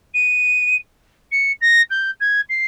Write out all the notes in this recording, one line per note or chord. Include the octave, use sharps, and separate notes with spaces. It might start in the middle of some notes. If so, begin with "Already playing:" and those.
D#7
C#7
A#6
G6
G#6
C7